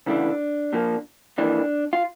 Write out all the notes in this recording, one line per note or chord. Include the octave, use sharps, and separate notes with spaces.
D2 C#3 E3 A3 D4
A#2 F3 A#3
F2 E3 A#3 D4
F4